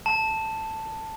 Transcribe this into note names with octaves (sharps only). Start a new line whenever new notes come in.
A5